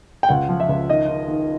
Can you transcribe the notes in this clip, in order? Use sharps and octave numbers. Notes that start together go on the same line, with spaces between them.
G5
C#2 F#5
F3
E5
C#2
D#3 D#5
D#3
D#3